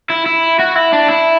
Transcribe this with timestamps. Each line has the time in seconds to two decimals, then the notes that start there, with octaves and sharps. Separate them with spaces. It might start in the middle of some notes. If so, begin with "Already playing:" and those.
0.10 E4
0.26 E4
0.59 F#4
0.76 E4
0.92 D4
1.08 E4